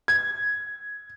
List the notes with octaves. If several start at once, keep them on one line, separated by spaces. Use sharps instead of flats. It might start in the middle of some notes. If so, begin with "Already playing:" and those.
G#6